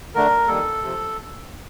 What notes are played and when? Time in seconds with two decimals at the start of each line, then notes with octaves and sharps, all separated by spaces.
0.14 D3 A3 D4 A#4
0.48 D#3 G3 A#3 A4
0.83 C3 F3